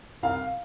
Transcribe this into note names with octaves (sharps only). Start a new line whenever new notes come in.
C2 F5